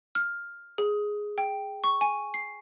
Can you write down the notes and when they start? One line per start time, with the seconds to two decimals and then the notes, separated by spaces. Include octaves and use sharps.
0.15 F6
0.78 G#4
1.38 G5
1.84 C#6
2.01 G#5
2.34 C7